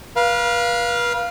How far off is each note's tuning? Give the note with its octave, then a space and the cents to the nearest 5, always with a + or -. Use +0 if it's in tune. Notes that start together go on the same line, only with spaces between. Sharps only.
B4 -35 F5 +0